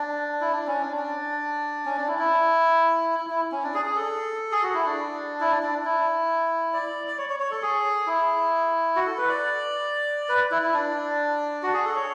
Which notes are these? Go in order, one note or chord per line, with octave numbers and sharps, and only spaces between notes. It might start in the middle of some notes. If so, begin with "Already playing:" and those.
Already playing: D4
E4
D4
C#4
D4
D4
C#4
D4
E4
E4
E4
E4
C#4
D4
G#4
G#4
A4
G#4
F#4
E4
D4
E4
D4
D4
E4
D5
D5
C#5
C#5
C#5
A4
G#4
E4
F#4
A4
B4
D5
B4
E4
E4
D4
F#4
G#4
A4
C#5